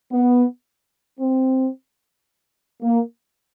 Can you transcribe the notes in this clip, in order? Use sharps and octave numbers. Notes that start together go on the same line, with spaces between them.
B3
C4
A#3